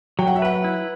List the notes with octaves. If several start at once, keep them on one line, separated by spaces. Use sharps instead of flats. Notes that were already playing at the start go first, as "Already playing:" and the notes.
F#3 G5
F#5
E5
B4 F#5
E4